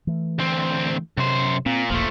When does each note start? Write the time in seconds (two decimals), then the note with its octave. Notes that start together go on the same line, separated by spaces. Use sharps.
0.07 E3 A3
0.39 D2 C4
1.17 F#2 C3 C5
1.66 A#2 C4
1.90 E1 A#1 F3 A3 A#3